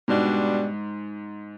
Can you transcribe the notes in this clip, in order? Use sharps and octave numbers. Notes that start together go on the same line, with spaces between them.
G#2 B2 G3 D4